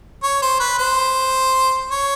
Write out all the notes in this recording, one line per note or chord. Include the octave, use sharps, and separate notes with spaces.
C#5
C5
B4
C5
C#5